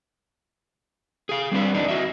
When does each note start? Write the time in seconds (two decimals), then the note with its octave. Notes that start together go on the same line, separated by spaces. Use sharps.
1.29 G#4 F5
1.52 G3 C4 D4 B4
1.74 E2 D4 D#4
1.88 F#4 D#5 E5